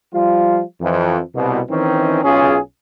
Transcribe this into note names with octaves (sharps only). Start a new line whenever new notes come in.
F3 G3 F4
F2 E3
C2 B2
D#3 E3 C4 C#4 D#4
B1 C#4 F4 G#4